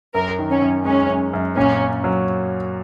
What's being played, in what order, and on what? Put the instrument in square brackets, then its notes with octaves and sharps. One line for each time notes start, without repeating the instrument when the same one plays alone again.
[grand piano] F#2 [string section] A#4
[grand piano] D#3
[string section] C#4
[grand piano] F#2
[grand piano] G#3 [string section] C#4
[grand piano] F#2
F#2
[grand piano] A#2 [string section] C#4
[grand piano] C#4
F#3